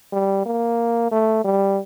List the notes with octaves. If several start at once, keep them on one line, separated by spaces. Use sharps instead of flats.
G3
A#3
A3
G3